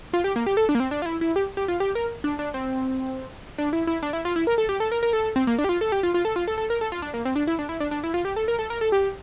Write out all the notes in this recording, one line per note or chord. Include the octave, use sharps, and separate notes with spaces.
F4
G4
A#3
G4
A4
D4
A#3
C4
D4
F4
E4
E4
G4
G4
F4
G4
A#4
D4
D4
C4
D4
E4
E4
D4
E4
F4
E4
A#4
A4
G4
A4
A#4
A#4
A4
C4
A#3
D4
G4
F4
A4
G4
F4
F4
A4
F4
A4
A4
A#4
A4
F4
D4
A#3
C4
D4
E4
D4
E4
D4
D4
E4
F4
G4
A4
A#4
A4
A#4
A4
G4